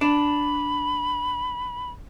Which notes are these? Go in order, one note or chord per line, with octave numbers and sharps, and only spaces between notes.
D4 B5